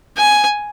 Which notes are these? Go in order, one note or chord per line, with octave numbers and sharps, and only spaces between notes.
G#5